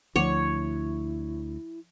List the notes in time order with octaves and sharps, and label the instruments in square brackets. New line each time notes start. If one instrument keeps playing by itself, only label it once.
[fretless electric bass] D2 [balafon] F3 F#5 D6 [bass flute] E4 [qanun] C#5